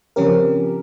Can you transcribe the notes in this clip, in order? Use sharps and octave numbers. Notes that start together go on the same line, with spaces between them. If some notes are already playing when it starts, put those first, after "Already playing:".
C#3 F3 C4 C#4 G4 A#4